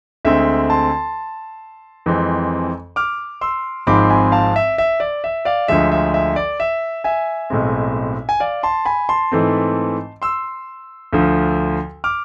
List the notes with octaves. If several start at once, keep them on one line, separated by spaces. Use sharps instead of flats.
D2 D3 G#3 C4 E5
A5 C6
F2 E3 G#3 C4
D6 F6
C6 E6
G#1 G#2 F3 G#3 C4 B5 D6
G#5 B5
F5 A5
E5
E5
D5
E5
D5 F5
D2 D3 F3 G#3 E5
E5
E5
D5
E5
E5 G#5
B1 A2 G#3 C4
G#5
D5 F5
A5 C6
G#5 B5
A5 C6
G#2 E3 A3 C4
C6 E6
D2 D3 F3
D6 F6